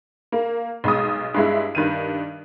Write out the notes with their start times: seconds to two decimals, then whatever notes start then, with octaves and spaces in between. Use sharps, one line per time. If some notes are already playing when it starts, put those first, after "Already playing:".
0.32 A#3
0.84 B1 G#3 D#6
1.34 G2 G#3 E4
1.75 G2 D#3 D#7